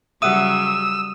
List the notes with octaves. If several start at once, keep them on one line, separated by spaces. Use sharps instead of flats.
C#3 F#3 G3 E5 F#5 D#6 E6 D#7